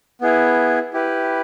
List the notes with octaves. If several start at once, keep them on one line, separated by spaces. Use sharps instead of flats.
B3 E4 G#4
E4 G4 B4